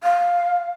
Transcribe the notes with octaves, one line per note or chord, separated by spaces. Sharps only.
F5